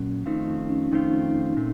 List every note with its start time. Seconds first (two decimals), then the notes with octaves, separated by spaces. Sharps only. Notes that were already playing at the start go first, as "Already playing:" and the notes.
Already playing: A#2 F#3 C#4
0.26 F2 D#3 A3 C4 D#4 F4
0.48 C#4
0.69 C#4
0.91 F2 D#3 A3 C4 D#4 F4
1.57 A#2 A3 C4